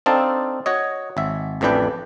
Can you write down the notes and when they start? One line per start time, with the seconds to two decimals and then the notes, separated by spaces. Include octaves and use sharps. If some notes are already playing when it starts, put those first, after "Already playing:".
0.06 C4 D4 D#4 A4 F5 A5
0.66 F#4 C#5 D#5
1.17 G#1 E5
1.61 A1 F2 E3 D4 B4 G5